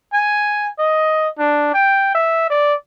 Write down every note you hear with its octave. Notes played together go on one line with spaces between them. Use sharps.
G#5
D#5
D4
G5
E5
D5